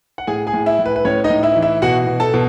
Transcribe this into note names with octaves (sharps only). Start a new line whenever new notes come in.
F#5
A2 G#4 G#5
G#4 G#5
A2
E4 E5
A2
B4
B4
A2 C#4 C#5
D#4 D#5
A2
E4 E5
E3
E4 E5
B2 F#4 F#5
B2
A4 A5
B2